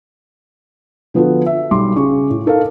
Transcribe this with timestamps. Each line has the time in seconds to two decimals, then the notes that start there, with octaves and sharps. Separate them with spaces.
1.14 D3 F3 B3 F4 F#4 A4
1.46 E5
1.71 B1 G3 C6 D6
1.96 C#3 G#4 C#6
2.30 A2
2.46 D#4 A4 A#4 F5